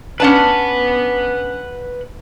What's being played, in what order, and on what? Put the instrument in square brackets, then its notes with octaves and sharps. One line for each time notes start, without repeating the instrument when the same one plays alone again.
[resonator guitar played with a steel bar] C#4 D4 A5 [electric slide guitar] B4 F#5